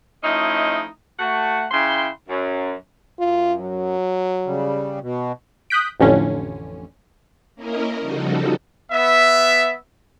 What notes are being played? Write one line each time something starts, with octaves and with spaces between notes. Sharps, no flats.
F3 A3 C#4 D#4 E4 D#5
A3 F#4 F#5
C#3 E4 G5 C6
F#2
F#2 F4
F#3
C#3 G3
B2
D#6 F#6 G6 B6 D7
A1 F2 D3 C#4
A#3 C#4 E4 A#4 D#5
C#3 F3 G3 D#4 F#4 A4
B3 E5